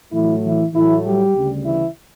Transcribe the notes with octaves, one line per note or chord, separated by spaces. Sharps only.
A2 E3 F#3 A3 E4
E3 E4
A2 E3 F#3 A3 E4
G3 G4
D2 C#3 G3
E3 E4